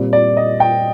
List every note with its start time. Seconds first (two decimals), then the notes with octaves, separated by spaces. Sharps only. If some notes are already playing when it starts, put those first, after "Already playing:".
Already playing: A#2 G3 C4
0.13 D5
0.37 D#5
0.60 G5